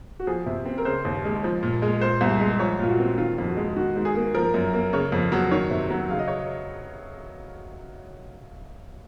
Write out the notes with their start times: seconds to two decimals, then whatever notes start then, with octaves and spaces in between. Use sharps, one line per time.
0.20 F#4
0.27 F3 G#4
0.46 C3
0.65 C4
0.78 A#4
0.85 C#3 C5
1.05 D#2
1.25 G#3
1.44 F3
1.63 A#2
1.82 G#3
2.01 A#2 C5
2.21 C2
2.41 G#3
2.60 F3 C#5
2.79 A#2 F4
2.89 F#4
2.99 C4
3.18 D#3 F4
3.38 F2
3.48 F#4
3.57 G#3
3.76 D#3 F#4
3.96 G#2
4.05 G#4
4.15 A#3
4.35 F3 A#4
4.54 F#2
4.73 A#3
4.93 C#3 C#5
5.12 F2
5.32 F#3
5.51 D#3 C#5
5.71 C3
5.91 F#3
6.09 C#3 F5
6.19 D#5
6.28 C#5